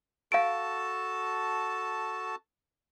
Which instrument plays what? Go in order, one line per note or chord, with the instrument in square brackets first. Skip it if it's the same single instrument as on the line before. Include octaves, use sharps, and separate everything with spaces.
[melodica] F#4 A4 A5 [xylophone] F5 D7